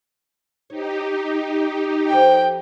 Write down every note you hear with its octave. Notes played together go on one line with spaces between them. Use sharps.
D#4 G4 C#5
F3 A4 C5 G5